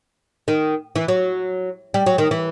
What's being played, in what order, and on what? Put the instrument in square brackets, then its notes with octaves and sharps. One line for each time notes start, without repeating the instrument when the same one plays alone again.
[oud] D#3
E3
F#3
G3
F#3
D#3
E3